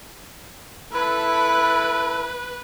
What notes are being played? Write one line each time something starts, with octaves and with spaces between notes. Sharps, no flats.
E4 A4 B4